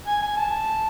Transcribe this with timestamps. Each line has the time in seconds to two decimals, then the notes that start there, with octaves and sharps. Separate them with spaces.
0.07 G#5
0.22 G#5
0.37 A5